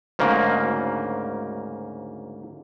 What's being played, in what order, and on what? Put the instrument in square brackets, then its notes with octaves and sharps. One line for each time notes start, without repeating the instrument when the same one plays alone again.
[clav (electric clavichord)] D2 G#2 C#3 A#3